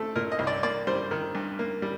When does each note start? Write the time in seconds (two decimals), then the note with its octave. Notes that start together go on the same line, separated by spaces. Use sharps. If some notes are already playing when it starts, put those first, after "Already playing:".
Already playing: A3 C4 A4
0.16 A#2 A#4
0.32 D#5
0.39 C2
0.47 D5
0.63 A#3 D5
0.87 G3 C5
1.11 D#3
1.35 G2
1.59 A#3
1.82 G3